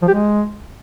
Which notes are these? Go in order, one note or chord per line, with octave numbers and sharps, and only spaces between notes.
F3
G4
G#3